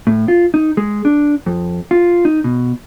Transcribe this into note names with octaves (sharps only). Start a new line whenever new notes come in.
A2
F4
D#4
G#3
D4
F2
F4
D#4
B2